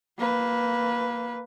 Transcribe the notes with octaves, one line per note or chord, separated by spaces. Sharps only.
A#3 B4